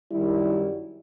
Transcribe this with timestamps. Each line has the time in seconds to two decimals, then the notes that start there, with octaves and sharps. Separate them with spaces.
0.12 F#2 D#3 G3 E4